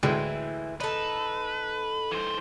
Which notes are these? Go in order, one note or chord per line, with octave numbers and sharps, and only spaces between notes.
D2 A2 E3 G#3
D#4 A4 B4
E3 C5